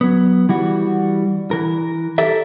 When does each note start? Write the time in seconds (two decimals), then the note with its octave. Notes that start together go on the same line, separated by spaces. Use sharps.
0.01 F#3 B3
0.49 E3 G3 F#4
1.51 E3 A#4
2.18 G4 A4 A#4 E5